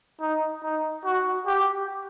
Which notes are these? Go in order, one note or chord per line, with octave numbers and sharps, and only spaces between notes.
D#4
D#4
F#4
G4